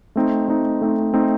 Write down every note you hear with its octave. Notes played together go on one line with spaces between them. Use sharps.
A3 C4 D#4
A3 C4 D#4
A3 C4 D#4
A3 C4 D#4